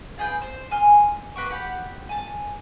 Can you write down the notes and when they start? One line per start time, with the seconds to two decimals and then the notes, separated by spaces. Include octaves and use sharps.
0.18 F4 G#4 B4 G5
0.42 C5
0.71 G#5 C6 F6
1.36 A#3 B4 G5 C#6
1.50 G4 F#5 B5
2.09 G#5 A5